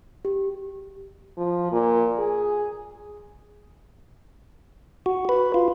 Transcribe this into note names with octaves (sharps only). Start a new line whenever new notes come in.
G4
F3
A#2
G#4
F#4
B4
F4